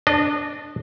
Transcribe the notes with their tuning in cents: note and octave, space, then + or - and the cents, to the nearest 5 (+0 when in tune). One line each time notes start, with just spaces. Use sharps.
D4 +0 D#5 -30